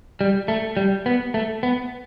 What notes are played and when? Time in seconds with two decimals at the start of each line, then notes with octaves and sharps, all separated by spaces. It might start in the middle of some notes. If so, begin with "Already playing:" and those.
0.21 G3
0.48 A3
0.77 G3
1.06 B3
1.34 A3
1.63 B3